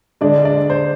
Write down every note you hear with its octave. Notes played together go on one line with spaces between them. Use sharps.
D3 G#3 D4 D5
D5
C5